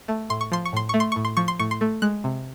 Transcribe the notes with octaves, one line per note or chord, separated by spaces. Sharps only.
A3
A2 C6
C#6
F3 C6
C#6
A2 C6
A3 C#6
C6
A2 C#6
C6
F3 C#6
C6
A2 C#6
C6
A3
G#3 F#6
C3